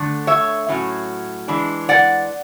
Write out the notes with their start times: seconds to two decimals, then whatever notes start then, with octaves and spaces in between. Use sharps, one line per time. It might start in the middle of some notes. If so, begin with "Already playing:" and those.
Already playing: D3 A3 D4
0.27 C#5 E5
0.68 A2 F#3 C#4
1.48 E3 G#3 D4
1.89 D5 F#5